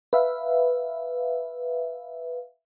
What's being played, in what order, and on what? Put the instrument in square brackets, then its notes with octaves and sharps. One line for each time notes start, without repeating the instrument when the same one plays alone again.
[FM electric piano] B4 E5 F5